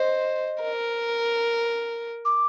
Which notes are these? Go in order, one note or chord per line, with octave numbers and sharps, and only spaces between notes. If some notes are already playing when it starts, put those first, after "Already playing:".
Already playing: C5 D#5
A#4
D6